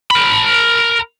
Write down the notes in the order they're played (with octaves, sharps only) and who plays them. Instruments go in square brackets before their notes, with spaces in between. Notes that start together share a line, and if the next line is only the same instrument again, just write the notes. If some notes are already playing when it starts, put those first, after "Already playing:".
[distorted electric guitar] A#4 B5